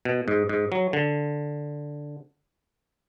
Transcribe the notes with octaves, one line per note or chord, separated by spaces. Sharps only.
B2
G#2
G#2
F#3
D3